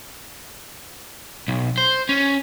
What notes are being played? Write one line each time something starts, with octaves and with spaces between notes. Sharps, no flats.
B1
C5
C#4